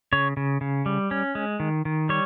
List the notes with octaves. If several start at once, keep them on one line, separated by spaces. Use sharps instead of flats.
C#3 C#5
C#3
C#3
G3
C#4
G#3
D#3
D#3
G3 C#5